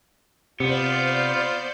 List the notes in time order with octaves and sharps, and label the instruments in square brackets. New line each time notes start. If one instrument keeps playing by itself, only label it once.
[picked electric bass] C3 [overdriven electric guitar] B3 [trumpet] F4 [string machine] C5 D5 G6